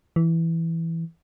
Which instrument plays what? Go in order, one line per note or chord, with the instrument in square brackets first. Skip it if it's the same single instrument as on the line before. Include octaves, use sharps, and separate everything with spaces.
[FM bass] E3